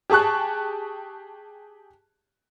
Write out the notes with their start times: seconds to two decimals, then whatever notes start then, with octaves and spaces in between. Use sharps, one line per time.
0.10 G4 G#4 A5 C#6 F#6